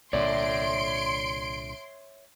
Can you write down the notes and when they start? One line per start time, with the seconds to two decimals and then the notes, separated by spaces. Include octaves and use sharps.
0.13 C2 A#2 D3 C#5 D5 E5 C6 D7